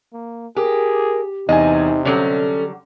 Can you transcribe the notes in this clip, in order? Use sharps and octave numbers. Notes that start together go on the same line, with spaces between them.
A#3
G4 G#4 A#4
E2 C3 D#4 D#5 G#5
D3 F#3 G3 C#4 A4